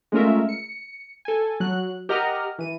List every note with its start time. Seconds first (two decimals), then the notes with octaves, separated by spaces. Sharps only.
0.12 G#3 A3 C#4 F4 A#4 E5
0.49 C#7
1.25 A4 G#5
1.60 F#3 F#6
2.09 G4 A#4 D#5 F#5 A#5 F6
2.59 E3 D#7